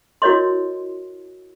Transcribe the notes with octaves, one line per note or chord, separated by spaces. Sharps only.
E4 F#4 A#4 C#5 D#5 C6